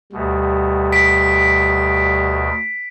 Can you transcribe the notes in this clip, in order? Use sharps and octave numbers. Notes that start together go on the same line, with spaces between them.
D2 B2 G3
B6 D7